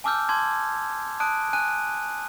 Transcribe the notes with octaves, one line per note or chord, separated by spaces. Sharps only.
G#5 A5 D6 E6 F6 G6
A5 C6 D6 G#6
A5 D#6 F#6 D7
G#5 F#6 D#7